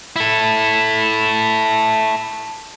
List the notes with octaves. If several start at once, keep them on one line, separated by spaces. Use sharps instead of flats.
E4 A4